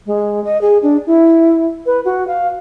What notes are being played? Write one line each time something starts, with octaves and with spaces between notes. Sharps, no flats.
G#3
D#5
G#4
D4
E4
B4
F#4
F5